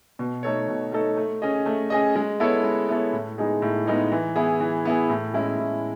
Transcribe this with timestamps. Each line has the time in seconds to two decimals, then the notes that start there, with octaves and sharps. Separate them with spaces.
0.19 B2
0.43 A3 D#4 A4 C#5
0.68 B2
0.92 A3 D#4 A4 C#5
1.17 A3
1.42 C#4 G#4 D#5
1.66 A3
1.90 C#4 G#4 D#5
2.16 G#3
2.40 B3 E4 A4 C#5
2.64 G#3
2.88 B3 E4 A4 C#5
3.13 A2
3.38 G#3 B3 D#4 G#4
3.62 A2
3.86 G#3 B3 D#4 G#4
4.12 E3
4.36 B3 E4 G#4
4.60 E3
4.85 B3 E4 G#4
5.10 A2
5.34 G#3 C#4 E4
5.59 A2